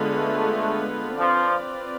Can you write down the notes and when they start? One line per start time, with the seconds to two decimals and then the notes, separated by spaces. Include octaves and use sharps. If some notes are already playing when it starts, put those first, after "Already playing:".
Already playing: D3 G#3 B3 F4 B4
0.14 A3
1.18 F3 C4 F4 B4 D5